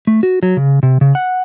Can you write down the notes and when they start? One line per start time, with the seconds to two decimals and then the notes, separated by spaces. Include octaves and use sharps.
0.07 A3
0.23 F#4
0.43 F#3
0.57 C#3
0.83 C3
1.01 C#3
1.15 F#5